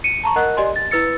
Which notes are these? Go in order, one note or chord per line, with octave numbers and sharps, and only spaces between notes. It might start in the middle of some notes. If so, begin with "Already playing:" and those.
C#7 D#7
A5 A#5 C#6
A#4 D#5 F#5 F#6
G4 D5 D#5 G#5 C6
A6
E4 B4 E6 A6 C#7